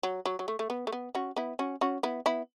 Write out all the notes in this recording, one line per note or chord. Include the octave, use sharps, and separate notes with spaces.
F#3
F#3
F#3
A3
A3
B3
A3
B3
C#4 F#4
B3 E4
C#4 F#4
C#4 F#4
B3 E4
B3 E4